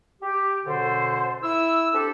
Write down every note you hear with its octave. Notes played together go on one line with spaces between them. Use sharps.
G4
F#2 B2 D3 A4 C5
E4 E6
C4 D4 G4 A4